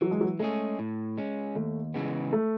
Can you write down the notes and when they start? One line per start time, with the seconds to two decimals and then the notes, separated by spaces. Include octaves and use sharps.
0.01 E3 F#3
0.11 G#3
0.21 F#3
0.39 G#3 A3 C#4 G#4
0.79 A2
1.18 G#3 C#4
1.55 D#2 A3
1.94 C#3 E3 G#3 B3
2.33 A3